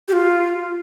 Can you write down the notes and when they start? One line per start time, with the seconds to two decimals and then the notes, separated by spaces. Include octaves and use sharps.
0.08 G4
0.13 F4